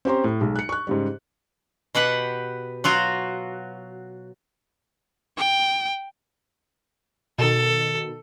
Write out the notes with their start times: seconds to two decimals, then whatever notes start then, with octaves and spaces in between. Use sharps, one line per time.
0.05 C4 C#4 G4 C5 A#5 C6
0.24 A2
0.41 B1 G#3
0.56 F#6 C#7
0.69 C#6 F#6
0.87 G#2 C#3 G3
1.95 B2 G4 B4 F#5
2.84 F#3 F4 F#4
5.38 G5
7.39 B2 D#3 A4